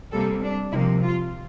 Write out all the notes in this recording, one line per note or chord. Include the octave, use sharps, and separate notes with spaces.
C3 G3 A#3 A4
D4
C3 F3 A#3 E4
F4